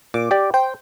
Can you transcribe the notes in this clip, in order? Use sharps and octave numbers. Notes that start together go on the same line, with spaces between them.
A#2 D6
G4 D5
C5 G5